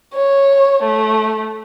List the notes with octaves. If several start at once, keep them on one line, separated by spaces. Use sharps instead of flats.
C#5
A3